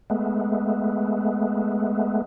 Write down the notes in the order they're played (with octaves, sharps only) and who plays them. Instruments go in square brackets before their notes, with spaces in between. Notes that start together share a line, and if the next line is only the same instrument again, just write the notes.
[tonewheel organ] G#3 A3 B3